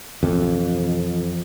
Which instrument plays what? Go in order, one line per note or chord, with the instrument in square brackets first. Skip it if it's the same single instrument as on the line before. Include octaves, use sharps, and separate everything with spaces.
[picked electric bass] B1 E3 [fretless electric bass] F2